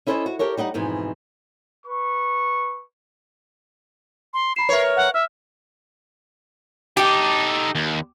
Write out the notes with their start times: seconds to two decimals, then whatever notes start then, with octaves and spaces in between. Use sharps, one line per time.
0.07 C#4 E4 A4 C5 D5 D#5
0.26 F#4
0.39 G4 A4 A#4 C#5
0.57 G3 D#4 D#5 F#5
0.74 F2 G#2 B2 E3
1.87 B4 C#6
4.34 C6
4.56 A#5 B5 C7 E7
4.69 A#4 B4 C#5 E5
4.97 F#5
5.14 E5 F6
6.97 D#4 G4 A4
7.75 D#2